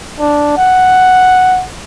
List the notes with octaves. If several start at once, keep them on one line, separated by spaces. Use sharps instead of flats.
D4
F#5